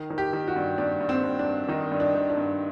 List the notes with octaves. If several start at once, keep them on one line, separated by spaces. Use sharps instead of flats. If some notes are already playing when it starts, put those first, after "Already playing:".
Already playing: D#3
D#3
G4
D#3
F#4
G2
G2 D4
G2
C4
G2
D4
G2
D#3 D#4
G2
D4
D#3
D4
G2